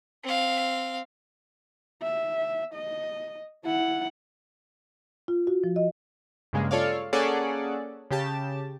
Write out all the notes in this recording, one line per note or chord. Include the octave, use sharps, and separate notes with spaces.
C4 F5
E5
D#5
E4 F#5
F4
F#4
F3
D#5
G2 C#3 G#3 A#3
F4 A4 C#5 D5 F5
A#3 C#4 G#4 A4 D5 F#5
C#3 G4 A5